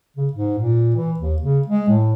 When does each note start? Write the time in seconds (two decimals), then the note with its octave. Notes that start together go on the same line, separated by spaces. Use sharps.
0.17 C#3
0.33 G#2
0.58 A#2
0.96 E3
1.19 D#2
1.42 C#3
1.67 G#3
1.88 A2